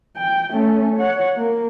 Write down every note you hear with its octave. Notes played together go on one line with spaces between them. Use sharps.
G5
A3 C#4
C#5 F#5
A#3